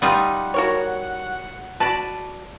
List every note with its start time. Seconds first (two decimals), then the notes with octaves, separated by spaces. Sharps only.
0.02 G3 D#4 F4 F#5
0.54 F#4 A#4 C#5
1.80 F#4 B4 D5 A5